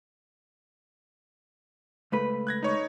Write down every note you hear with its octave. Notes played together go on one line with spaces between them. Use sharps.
C#2 A3 B4
F#6 G#6 A#6
D#4 C#5 C#6